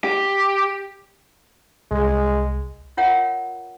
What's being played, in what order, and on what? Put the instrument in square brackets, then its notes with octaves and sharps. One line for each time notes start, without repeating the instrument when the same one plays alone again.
[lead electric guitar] G4
[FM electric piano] C2 [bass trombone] G#3
[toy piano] F4 A#4 C#5 E5 F#5 A#5